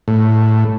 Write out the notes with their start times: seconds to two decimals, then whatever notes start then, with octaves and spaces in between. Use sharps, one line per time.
0.08 A2